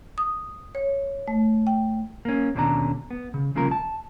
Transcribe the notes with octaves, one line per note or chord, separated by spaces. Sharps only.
D#6
C#5
A3
G5
A#3 C#4
D#2 B2 D3 C#4 D4 A#5
B3
C#3
C2 C#3 F3 A#3 A#4
A5